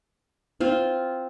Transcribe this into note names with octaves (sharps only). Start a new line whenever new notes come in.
C4 F4